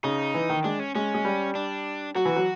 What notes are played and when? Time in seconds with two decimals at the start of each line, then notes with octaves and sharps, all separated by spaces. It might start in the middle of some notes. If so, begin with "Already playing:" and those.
0.04 C#3 D#4
0.34 E3
0.50 D#3
0.64 G#3 D4
0.79 C#4
0.95 G#3 C#4
1.14 G#3
1.25 G3
1.55 D4
2.15 F#3 F#4
2.25 E3
2.36 F#3